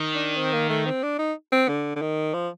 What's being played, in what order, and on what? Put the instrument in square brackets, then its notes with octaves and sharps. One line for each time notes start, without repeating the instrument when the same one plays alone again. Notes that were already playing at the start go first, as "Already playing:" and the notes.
Already playing: [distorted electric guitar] D#3
[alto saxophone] D4
C4
A#3
A3
C4
D4
D#4
C4
D3
D3
D#3
F3